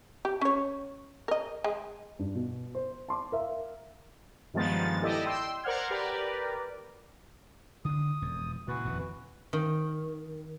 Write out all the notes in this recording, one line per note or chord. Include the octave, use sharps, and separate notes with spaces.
G4
C#4 C#5
A#4 D#5
G#3 G#4
G2
B2
C5
A5 C6 D6
A#4 E5 F5
G2 D#3 F3 G#3 B3 A6
E4 G4 A4 D5 D#5
G5 C6 E6
A#4 C5 D5 F#5 F6 G#6
G4 A#4 B4 D5
D3 D4 D#6
E1 F2
A#2 C#3 E3 F#4 B4
D#1 F2 C#3
D#3